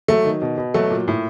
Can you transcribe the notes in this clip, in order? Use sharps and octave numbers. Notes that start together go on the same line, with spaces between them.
F#3 A3
D#3
B2
B2
F#3 A3
A#2
A2